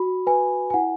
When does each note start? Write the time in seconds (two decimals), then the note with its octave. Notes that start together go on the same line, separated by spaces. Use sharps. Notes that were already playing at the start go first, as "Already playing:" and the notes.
Already playing: F#4 B5
0.27 B4 G#5
0.70 G#5
0.74 E4 F#5